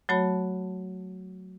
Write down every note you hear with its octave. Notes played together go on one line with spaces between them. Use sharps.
F#3 A3 F#4 C#5 A5 B5